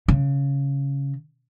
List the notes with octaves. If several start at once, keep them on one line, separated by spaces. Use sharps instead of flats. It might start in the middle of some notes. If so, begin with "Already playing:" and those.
C#3